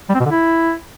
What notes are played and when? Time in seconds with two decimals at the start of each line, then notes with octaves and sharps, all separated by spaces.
0.09 G3
0.15 C4
0.20 B2
0.25 D3
0.31 E4